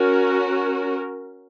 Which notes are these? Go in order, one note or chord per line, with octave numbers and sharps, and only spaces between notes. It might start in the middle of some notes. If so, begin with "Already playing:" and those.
Already playing: C#4 F#4 A#4